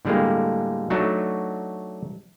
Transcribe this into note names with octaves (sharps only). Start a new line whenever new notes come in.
A2 D3 G3 G#3 A#3
F#3 A3 D4 D#4 F#4